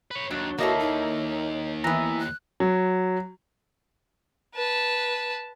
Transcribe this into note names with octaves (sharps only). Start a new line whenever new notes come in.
B4 C#5
D#2 F#3 D4
D#2 A#3 E4 F#4 A4 C#5 D#5 A#5
D#4
E3 B3 E4 A#5
F#6
F#3
B4 A5